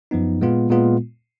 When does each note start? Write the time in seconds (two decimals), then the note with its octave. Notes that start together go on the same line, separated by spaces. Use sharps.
0.11 F#2 F3 B3 D#4
0.41 A#2 G#3 B3 F4
0.70 A#2 G#3 B3 F4